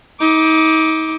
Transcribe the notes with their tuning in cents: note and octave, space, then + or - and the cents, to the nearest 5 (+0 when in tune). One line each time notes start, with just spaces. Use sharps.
D#4 +35 D6 +0